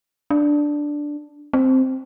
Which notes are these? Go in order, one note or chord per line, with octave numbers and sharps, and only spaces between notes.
D4
C4